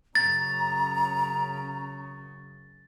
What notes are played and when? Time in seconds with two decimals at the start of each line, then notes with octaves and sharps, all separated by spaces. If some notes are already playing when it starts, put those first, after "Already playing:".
0.15 F#2 C#3 A#5 A6